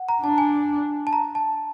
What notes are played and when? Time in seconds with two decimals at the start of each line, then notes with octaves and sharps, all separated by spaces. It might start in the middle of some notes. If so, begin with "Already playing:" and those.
Already playing: F#5
0.09 A#5
0.23 D4 A5
0.38 G#5
1.07 A5
1.13 A#5
1.35 A5